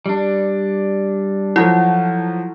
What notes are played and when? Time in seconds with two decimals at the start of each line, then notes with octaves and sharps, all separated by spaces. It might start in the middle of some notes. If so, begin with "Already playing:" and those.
0.06 G3 D4
1.56 F3 F#3 E4 F#4 A4 A#4